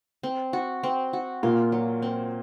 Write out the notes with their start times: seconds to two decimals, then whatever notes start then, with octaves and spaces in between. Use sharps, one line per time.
0.23 C4
0.53 F#4
0.83 C4
1.13 F#4
1.43 A#2 A#3 F4
1.72 F#3
2.02 C4